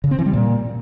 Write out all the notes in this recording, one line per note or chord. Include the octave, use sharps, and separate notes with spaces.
C#3
C4
E3
G3
A#2